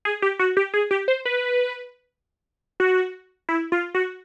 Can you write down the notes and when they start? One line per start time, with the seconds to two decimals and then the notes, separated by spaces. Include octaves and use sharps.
0.05 G#4
0.22 G4
0.39 F#4
0.57 G4
0.74 G#4
0.91 G4
1.08 C5
1.25 B4
2.80 F#4
3.49 E4
3.72 F4
3.94 F#4